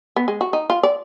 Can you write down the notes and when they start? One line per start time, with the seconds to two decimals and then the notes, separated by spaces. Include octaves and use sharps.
0.16 B3
0.28 G#3
0.41 F#4
0.53 D#4
0.70 F4
0.83 D5